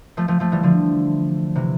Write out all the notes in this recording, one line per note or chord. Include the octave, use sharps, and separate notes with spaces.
F3 A3
F3 A3
F3 A3
E3 G3
D3 F3
C3 E3